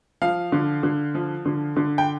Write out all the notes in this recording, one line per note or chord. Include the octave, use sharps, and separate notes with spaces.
F3 F5
D3
D3
F3
D3
D3
G5